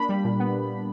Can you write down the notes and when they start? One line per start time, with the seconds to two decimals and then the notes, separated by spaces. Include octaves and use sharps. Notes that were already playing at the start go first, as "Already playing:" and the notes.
Already playing: A#3 D4 B5
0.09 G3
0.24 A#2
0.40 B3